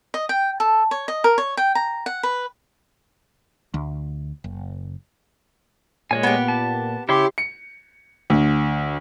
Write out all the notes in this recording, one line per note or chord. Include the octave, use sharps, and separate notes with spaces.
D#5
G5
A4
C#5
D#5
A#4
C#5
G5
A#5
F#5
B4
D2
F#1
A#2 G#3 C#5 G#5
B3 G4
A5
C#3 E4 G4 C#5 C6
C#7
D2